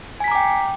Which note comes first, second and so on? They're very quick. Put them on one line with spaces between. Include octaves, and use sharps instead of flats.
G#5 B6 A#5 D6 G5